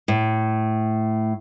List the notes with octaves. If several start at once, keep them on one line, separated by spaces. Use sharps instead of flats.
A2